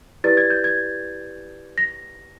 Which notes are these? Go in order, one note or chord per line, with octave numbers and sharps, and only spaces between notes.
E4 G4 B4 D5 A6
G#6
G6
G#6
A#6